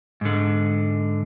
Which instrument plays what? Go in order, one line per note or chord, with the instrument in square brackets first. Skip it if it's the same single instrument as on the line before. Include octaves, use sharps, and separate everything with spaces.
[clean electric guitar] G#2 D3